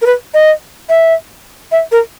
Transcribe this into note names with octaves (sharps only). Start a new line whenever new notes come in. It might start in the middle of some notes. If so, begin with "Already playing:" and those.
A#4
B4
D#5
E5
E5
A#4